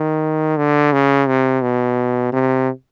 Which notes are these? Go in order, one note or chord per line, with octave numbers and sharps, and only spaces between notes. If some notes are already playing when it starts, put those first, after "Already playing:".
Already playing: D#3
D3
C#3
C3
B2
C3